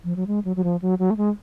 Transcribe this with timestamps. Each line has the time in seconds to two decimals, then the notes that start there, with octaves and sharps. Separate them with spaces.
0.04 F3
0.16 F#3
0.27 G#3
0.45 F#3
0.56 F#3
0.64 F3
0.82 F#3
0.99 F#3
1.10 A3
1.17 G#3